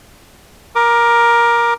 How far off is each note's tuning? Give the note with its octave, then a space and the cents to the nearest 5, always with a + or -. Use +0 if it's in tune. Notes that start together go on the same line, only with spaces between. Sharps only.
A#4 +15 D6 +15